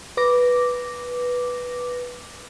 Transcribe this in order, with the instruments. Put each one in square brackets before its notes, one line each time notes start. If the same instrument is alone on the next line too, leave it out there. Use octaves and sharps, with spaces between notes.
[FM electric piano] B4 D6 A#6